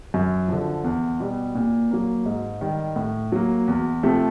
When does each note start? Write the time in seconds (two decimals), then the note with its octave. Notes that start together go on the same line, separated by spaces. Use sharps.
0.14 F#2
0.48 D3 F3
0.84 E2
1.20 B2 G3
1.55 A#2
1.91 F#3 A#3
2.26 G#2
2.61 D#3 G3
2.96 A2
3.32 F#3 A#3
3.68 E2
4.03 C3 F3 A3